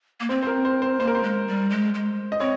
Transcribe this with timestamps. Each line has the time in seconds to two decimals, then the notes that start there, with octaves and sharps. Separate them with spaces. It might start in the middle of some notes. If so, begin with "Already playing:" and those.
0.20 A#3
0.29 C4 C5
0.43 C5
0.47 A#4
0.65 C5
0.82 C5
1.00 A#3 C5
1.07 A#4
1.15 C5
1.23 G#3
1.47 G3
1.70 G#3
1.94 G#3
2.32 D#5
2.40 C4 C#5